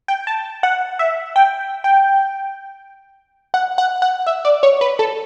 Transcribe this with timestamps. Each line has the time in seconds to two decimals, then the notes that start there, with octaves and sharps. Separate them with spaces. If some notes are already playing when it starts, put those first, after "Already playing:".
0.08 G5
0.27 A5
0.63 F#5
0.99 E5
1.36 G5
1.84 G5
3.54 F#5
3.78 F#5
4.02 F#5
4.27 E5
4.45 D5
4.63 C#5
4.81 B4
4.99 A4